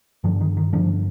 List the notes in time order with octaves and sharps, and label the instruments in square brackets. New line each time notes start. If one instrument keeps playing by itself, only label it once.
[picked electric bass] G2 D3 F3
D#3
D#3
G2 D3 F3